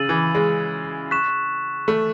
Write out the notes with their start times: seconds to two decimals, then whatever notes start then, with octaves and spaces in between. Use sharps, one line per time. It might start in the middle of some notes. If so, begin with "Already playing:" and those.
Already playing: C#3 E6 A6 D#7 F#7
0.09 E3
0.35 G#3
1.11 C#6 F#6 B6 E7
1.88 A3